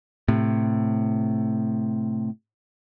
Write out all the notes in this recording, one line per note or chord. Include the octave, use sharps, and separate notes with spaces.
A2 C3